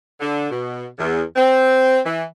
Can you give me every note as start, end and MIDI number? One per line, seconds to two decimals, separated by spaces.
0.20 0.46 50
0.51 0.86 47
0.99 1.22 40
1.36 1.98 60
2.05 2.23 52